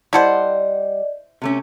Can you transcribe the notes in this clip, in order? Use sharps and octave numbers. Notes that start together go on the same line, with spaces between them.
G3 E4 A4 C5 D5 D#5 F#5
C3 A3 C#4